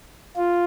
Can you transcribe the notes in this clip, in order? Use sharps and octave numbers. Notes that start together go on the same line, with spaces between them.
F4